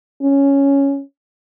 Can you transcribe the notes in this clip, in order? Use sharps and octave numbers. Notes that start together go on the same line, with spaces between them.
C#4